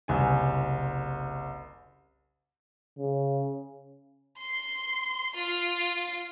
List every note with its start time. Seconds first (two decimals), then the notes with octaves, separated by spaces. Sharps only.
0.08 F#1 C2 G#5
2.99 C#3
4.39 C6
5.36 F4